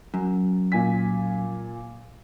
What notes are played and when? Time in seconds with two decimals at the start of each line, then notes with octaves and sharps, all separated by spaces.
0.14 F#2
0.72 A#2 G#5 B6